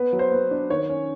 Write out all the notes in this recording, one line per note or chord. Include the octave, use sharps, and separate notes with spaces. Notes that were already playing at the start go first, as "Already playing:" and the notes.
Already playing: B3 B4
F#3
C5
B3
D4
D#3 C#5
C#4